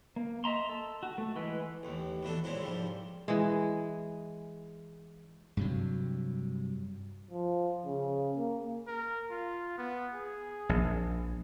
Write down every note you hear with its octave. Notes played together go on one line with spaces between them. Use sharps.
A#3
D#5 E5 A#5 C6
A4
F#4
A3
E3 G#3 B4
A1 D#2
B2 E3 D4 A4
F#2 A#2 G#3 C4 E4
C2 G#2 F3 G3
E3 G#3
G2 C3 F#3
F3
C#3
A#3
A#4
F4
B3
G#4
A#1